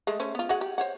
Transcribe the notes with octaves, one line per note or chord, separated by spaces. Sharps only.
G#3 A3
A3 C#4 C5
B3 F4
F#4 G#4 F#5
G4
C5 C#5 F#5